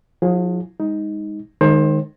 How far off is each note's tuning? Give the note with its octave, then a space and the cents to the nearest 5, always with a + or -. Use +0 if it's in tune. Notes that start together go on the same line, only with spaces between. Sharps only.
F3 +40 E4 +0 G#4 +0
G#3 -25 D#4 +10
D#3 -15 G#3 +0 C5 +25